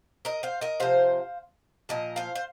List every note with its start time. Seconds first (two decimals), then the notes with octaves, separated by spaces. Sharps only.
0.25 A#4 D#5
0.43 C5 F5
0.61 A#4 D#5
0.80 C3 F3 C5 F5
1.89 A#2 F3 A#4 D#5
2.16 C5 F5
2.36 C5